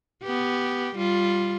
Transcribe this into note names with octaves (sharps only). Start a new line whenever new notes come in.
B3 G4
G3 F4